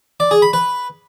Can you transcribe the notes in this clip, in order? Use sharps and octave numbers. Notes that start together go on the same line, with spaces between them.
D5
G#4
B5
B4